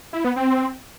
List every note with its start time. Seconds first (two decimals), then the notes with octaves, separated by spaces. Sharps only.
0.13 E4
0.25 B3
0.36 C4